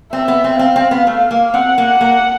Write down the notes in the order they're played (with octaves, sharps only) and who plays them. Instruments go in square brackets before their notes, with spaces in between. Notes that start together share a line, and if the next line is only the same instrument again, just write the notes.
[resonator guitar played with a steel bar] C4 [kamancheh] E5
[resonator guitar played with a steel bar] B3
C4
[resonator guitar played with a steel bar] C4 [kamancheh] F5
[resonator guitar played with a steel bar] C4
B3
A3
A#3
[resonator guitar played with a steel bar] C4 [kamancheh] F#5
[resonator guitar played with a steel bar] A#3
A#3